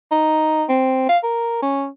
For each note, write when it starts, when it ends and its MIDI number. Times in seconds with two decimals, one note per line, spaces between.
0.12 0.64 63
0.69 1.08 60
1.09 1.18 77
1.23 1.60 70
1.62 1.87 61